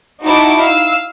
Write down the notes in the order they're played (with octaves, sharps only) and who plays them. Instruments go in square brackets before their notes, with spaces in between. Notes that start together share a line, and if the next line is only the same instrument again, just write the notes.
[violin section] D#4 E4 F#4 A5 D6
F5 E6